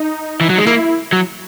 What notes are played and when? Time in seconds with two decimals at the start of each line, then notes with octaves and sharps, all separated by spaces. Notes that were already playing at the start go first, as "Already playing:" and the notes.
Already playing: D#4
0.41 E3
0.50 F#3
0.58 G#3
0.67 A#3 E4
1.12 F#3